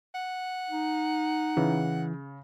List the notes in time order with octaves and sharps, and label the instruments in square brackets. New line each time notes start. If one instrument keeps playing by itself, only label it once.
[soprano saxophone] F#5
[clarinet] D#4
[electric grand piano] C#3 [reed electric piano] E3